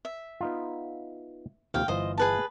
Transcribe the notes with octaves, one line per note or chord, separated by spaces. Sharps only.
E5
B3 D#4 F4
D#2 C3 F3 F5 G5
G1 E3 F4 C5 D#5
G#4 B4 A5